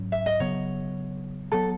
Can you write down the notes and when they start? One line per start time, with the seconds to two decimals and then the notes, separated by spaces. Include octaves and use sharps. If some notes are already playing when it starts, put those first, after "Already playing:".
Already playing: G#2 F#3 C#4
0.12 E5
0.26 D#5
0.40 C#3 F#3 B3 C#5
1.52 F#3 B3 A4